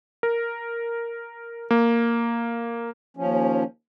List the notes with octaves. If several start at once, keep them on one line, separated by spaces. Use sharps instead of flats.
A#4
A#3
D#2 F3 C#4